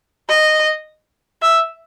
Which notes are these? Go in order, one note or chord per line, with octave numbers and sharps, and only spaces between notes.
D#5
E5